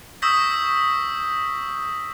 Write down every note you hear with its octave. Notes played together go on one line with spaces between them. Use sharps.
C#6 D#6 E6 G6 A#6 B6